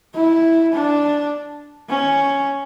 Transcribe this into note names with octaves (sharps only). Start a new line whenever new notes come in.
E4
D4
C#4